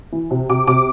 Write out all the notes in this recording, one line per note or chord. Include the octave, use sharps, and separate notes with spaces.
E3
C3
C3 D6
C3 D6